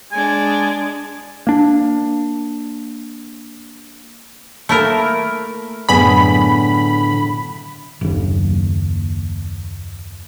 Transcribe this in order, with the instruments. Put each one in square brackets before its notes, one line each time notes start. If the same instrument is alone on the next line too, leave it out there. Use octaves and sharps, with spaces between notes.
[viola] G#3 D4 [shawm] G#5
[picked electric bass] A#3 D4
[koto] A3 E4 A#4 [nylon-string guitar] A#3
[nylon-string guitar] F#2 A2 D3 [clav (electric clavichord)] B3 G#4 D5 [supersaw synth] B5
[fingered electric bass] F#1 D#2